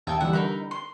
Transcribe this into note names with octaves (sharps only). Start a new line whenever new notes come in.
D#2 D#4 E5 G5 A5 G#6
D3 E3 G3 E5 F#5
D#4 A#4 B5
C6